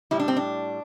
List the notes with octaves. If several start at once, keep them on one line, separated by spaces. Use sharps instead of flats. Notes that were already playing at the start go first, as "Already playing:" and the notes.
A2 G3 E4
D4
C4
D4